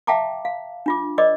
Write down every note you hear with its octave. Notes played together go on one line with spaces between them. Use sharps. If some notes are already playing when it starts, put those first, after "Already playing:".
E5 F5 G5 A5 A#5 D6
F5
D4 F4 D6
A#4 C5 D5 D#5 D6